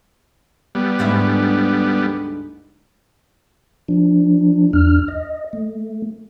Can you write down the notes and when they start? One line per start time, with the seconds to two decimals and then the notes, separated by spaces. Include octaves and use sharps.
0.75 G3 B3
0.99 D2 G#2 E4
3.88 F3 D4
4.73 E2 D4 F6
5.08 D#5
5.53 A3